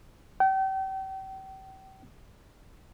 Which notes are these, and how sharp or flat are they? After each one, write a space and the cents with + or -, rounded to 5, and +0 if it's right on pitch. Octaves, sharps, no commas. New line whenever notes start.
G5 -35